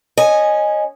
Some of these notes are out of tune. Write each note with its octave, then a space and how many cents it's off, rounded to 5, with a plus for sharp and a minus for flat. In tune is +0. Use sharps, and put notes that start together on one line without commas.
C#4 -15 D#5 -15 G#5 +0